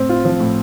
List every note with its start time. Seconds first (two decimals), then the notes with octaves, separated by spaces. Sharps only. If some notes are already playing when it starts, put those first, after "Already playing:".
Already playing: A2 C4
0.09 F4
0.25 F3
0.39 A2